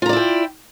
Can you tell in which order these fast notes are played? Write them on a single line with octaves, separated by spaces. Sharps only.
F4 A#5 D5 E4 G5